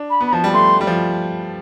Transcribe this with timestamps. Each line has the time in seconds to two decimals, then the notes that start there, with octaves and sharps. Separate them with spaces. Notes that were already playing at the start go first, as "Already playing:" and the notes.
Already playing: D4
0.10 B5
0.21 B3
0.27 B5
0.33 F3 A5
0.44 G3
0.54 A3 C6
0.81 G3
0.87 F3